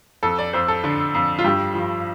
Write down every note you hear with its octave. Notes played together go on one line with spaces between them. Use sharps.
F2 A4
D5
F2 C5
A4
D3
F2
F4
G2 G4
F3